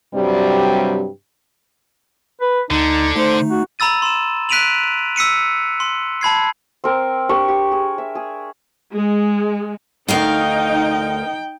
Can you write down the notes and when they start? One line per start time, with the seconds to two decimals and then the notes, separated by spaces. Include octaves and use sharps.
0.15 G2 C3 F#3 G3
2.41 B4
2.71 D2 D3 D#4
3.16 A3 D#4 C5
3.50 F#4
3.79 A#5 B5 E6 A6 D#7
4.02 C6 E7
4.49 F#6 B6 D7 D#7 F7 F#7
5.16 E6 B6 C#7 D#7
5.80 C6
6.21 A5 B5 G#6 C7
6.84 C4 A#4
7.29 D4 G4 A#4 C#6
7.48 G4
7.72 G#4
7.98 E5
8.15 G#4
8.93 G#3
10.08 D2 D#4 A#4 F5 G5